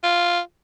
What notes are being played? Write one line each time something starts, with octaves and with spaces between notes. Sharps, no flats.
F4